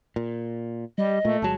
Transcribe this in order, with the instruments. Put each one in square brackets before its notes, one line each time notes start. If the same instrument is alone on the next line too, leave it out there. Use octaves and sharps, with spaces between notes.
[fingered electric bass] A#2
[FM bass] G3 [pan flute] D#5
[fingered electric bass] A#2 [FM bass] A3
[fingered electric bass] G1 F#3 G#3 [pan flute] A5